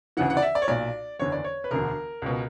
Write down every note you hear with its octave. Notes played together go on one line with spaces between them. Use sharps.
D2 C#3 E3 F#5
F#5
D5
E5
D5
C#5
B1 A#2 D5
F#1 E2 D3 C#5
D5
C#5
B4
E1 D2 D3 A#4
C#2 B2